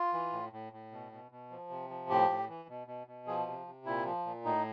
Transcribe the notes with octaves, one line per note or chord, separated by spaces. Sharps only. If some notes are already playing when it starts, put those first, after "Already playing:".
Already playing: F4
E3
A2
A2
A2
B2
B2
B2
F3
C3
F3
A2 G4
A2
E3
B2
B2
B2
F3 G#4
C3
C3
A#2 E4
F3
A#2
A2 D#4